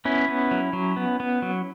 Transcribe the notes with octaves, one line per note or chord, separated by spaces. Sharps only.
B3 C#4 E4
B3
F#3
F#3
B3
B3
F#3